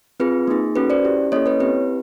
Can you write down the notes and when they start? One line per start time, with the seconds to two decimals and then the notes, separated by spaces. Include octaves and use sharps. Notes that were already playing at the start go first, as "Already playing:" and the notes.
0.20 C4 F4 G#4 B4
0.48 A#3 D#4 G#4
0.76 C#4 F#4 A4 B4
0.90 C5 D5
1.05 C#4 E4 G4
1.32 A#3 C#4 E4 A4 C#5 D#5
1.46 B4 C#5
1.60 C4 E4 G4 B4